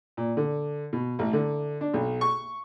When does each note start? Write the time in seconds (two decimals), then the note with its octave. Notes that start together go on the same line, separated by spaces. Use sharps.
0.17 A#2
0.37 D3
0.93 B2
1.19 A1
1.33 D3
1.81 D4
1.94 B1
2.21 C#6